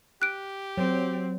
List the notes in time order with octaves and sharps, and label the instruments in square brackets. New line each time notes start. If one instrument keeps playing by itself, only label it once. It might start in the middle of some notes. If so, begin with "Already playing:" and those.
[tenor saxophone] G4 [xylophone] F#6 D7
[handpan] F#3 [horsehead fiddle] C4